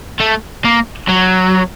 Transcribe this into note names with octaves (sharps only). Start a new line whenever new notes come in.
A3
A#3
F#3